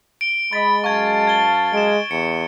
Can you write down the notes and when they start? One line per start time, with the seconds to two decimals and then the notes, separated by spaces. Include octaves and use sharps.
0.21 D7 G7
0.53 G#3 D#5 B5 A6
0.84 F#2 F5 A5 C#6 G#6
1.27 G#6 G7
1.73 G#3 D7 E7
2.11 E2 C#7